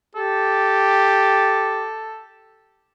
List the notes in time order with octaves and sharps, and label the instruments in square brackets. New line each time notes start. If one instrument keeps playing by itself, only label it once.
[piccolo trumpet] G4 [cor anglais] A4